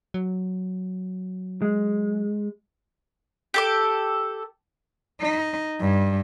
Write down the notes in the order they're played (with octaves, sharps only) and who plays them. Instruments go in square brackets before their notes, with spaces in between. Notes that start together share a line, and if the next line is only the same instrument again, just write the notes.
[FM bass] F#3
[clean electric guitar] G#3
[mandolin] G4 A4 D6
[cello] D#4
G2